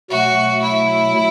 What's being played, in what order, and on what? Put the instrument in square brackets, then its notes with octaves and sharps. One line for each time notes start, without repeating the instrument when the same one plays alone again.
[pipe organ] B2 F#3 A3 [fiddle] F#4
[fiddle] E4